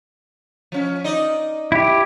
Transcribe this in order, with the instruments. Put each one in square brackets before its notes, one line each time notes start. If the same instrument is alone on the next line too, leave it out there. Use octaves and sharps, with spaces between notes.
[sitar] F3 C#4
D#4 D5 D#5
[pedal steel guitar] E4 G4